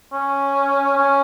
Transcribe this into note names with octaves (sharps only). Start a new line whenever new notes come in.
C#4
C#4